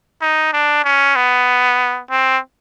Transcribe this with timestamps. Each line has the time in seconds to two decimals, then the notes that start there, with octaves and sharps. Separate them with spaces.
0.21 D#4
0.53 D4
0.84 C#4
1.16 B3
2.10 C4